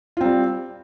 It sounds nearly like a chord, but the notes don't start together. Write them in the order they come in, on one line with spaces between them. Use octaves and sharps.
F4 C4 G3